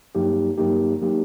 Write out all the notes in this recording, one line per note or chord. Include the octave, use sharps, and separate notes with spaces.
G2 F#3 A#3 D#4 G4
G2 F#3 A#3 D#4 G4
F#3 A#3 D#4 G4